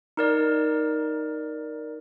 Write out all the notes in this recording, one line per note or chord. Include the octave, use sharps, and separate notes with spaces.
D#4 A#4 D5